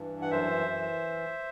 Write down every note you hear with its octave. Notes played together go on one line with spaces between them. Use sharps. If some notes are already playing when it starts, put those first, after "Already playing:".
Already playing: G2 E3
F#5
F#2 C5 E5
E3